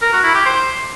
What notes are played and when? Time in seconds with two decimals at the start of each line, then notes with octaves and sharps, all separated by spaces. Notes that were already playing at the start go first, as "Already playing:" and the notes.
0.02 A#4
0.13 F#4
0.24 E4
0.35 G4
0.45 C5